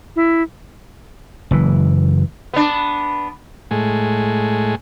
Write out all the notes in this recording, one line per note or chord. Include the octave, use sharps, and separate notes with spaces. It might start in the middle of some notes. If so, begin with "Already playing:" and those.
E4
F#1 E3
B3 D4
A2 G#3